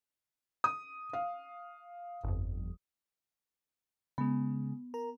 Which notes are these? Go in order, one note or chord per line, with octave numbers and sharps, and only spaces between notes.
D#6
F5
G1 F2
C#3 G#3 B3
A#4 A#5